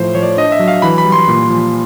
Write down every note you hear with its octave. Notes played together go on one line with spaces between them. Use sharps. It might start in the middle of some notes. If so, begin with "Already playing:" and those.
Already playing: A2 F3 C5
F3 C#5
D5
D4 D#5
E5
F#3
F5
E3 B5
B5
G3
C6
A#2
F3